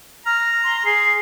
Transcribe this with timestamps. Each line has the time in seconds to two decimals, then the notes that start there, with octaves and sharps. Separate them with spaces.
0.26 A#5 F6
0.64 C6
0.85 G#4 C7